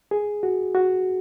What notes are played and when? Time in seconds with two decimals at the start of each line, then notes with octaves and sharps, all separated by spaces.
0.11 G#4
0.43 F#4
0.75 F#4